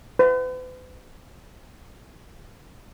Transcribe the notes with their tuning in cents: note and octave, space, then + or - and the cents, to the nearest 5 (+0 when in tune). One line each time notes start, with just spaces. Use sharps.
B4 +45